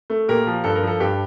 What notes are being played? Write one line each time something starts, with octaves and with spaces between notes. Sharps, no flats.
A3
A#2 G4 A#4
F3
G2 A4
A#4
F3 A4
G2 G4